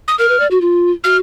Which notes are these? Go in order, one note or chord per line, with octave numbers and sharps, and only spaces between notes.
D#6
A#4 F6
B4
D5
F#4
F4
F#4 F6